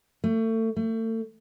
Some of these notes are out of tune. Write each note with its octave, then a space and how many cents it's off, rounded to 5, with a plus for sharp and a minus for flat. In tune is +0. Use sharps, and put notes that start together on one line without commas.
A3 +30
A3 +35